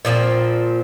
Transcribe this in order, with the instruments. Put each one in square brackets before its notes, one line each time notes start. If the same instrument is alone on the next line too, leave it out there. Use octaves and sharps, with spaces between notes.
[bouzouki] A#2 F3 A#3 C4